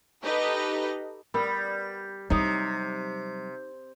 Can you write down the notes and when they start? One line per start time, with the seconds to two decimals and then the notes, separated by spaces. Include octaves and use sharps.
0.23 D#4 G4 A4 B4 D#5
1.34 G3 B3 C#4 A#4 B5
2.30 C3 F#3 G3 D#4 C#5 D#6